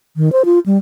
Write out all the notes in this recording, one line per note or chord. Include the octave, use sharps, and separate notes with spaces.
D#3
C5
F4
G3